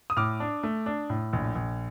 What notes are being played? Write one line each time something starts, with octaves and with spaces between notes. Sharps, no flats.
D#6
A2 D6 F6
D4
A3
D4
A2
A#1
A#1